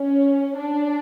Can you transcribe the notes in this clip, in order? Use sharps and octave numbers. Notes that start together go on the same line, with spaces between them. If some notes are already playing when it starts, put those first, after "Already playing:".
Already playing: C#4
D4